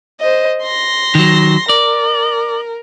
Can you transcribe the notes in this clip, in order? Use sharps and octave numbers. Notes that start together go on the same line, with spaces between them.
C5 D#5
C6 A#6
D#3 F#3
A#4 D5